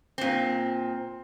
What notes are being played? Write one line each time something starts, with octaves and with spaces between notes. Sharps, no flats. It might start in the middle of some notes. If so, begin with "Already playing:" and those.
A#2 C4